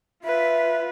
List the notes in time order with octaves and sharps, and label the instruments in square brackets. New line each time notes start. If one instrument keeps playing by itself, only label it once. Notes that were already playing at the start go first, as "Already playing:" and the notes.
[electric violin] F4 B4 [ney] E5